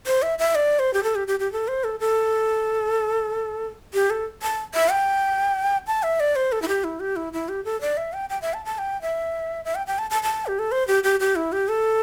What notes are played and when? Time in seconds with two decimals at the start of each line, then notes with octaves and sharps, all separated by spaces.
0.07 C5
0.22 E5
0.39 E5
0.55 D5
0.79 C5
0.94 G4
1.03 A4
1.15 G4
1.28 G4
1.40 G4
1.52 A4
1.68 C5
1.84 A4
2.00 A4
3.94 G4
4.10 A4
4.42 A5
4.74 E5
4.91 G5
5.87 A5
6.03 E5
6.20 D5
6.36 C5
6.52 A4
6.62 E4
6.68 G4
6.84 E4
7.00 G4
7.16 E4
7.33 E4
7.49 G4
7.65 A4
7.81 D5
7.97 E5
8.13 G5
8.30 G5
8.42 E5
8.54 A5
8.65 A5
8.78 G5
9.02 E5
9.65 E5
9.75 G5
9.87 G5
9.99 A5
10.11 A5
10.23 A5
10.47 G4
10.59 A4
10.72 C5
10.88 G4
11.04 G4
11.20 G4
11.36 E4
11.52 G4
11.68 A4